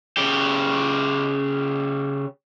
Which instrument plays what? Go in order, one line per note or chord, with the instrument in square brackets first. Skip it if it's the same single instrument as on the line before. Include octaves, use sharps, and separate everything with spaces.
[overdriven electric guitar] C#3 G4